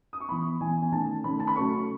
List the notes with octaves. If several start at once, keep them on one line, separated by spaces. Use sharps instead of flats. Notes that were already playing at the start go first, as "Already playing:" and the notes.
D#6
C#6
E3 B3 B5
E3 B3 G#5
G#5
D#3 A3 C#4 A5
D#3 A3 C#4 B5
A5
B5
C#3 F#3 A3 C#4 C#6